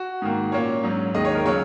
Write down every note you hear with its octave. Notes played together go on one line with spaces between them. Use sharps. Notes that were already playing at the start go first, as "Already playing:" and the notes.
Already playing: F#4
G#2 D#3 A#3
A#2 A#3 C#4 C#5
G#2 F#3 C#4
D#2 D#3 G#3 D#5
C#5
A#4
C#3 F#3 C#5